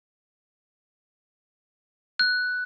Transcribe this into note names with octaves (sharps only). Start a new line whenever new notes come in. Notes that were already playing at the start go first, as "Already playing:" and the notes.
F#6